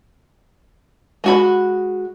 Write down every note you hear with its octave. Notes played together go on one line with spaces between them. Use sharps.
G#3 F#4 B5